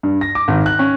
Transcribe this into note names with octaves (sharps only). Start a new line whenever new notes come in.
G2
A#6
D6
G#1
F#6
C#4